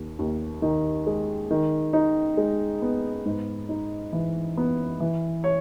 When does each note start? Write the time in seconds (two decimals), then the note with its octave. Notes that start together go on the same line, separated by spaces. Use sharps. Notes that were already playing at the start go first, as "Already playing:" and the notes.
Already playing: D#2
0.19 D#2
0.62 D#3
1.07 G#3
1.51 D#3
1.93 D#4
2.37 G#3
2.82 B3
3.26 G#2
3.69 D#4
4.13 E3
4.57 B3
5.00 E3
5.44 C#5